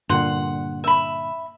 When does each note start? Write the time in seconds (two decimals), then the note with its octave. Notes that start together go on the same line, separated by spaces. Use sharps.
0.09 G2 A#2 D3 F#5 C6
0.84 E5 B5